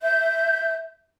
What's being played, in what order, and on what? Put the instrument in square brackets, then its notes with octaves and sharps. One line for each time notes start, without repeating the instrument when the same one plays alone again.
[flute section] E5 G6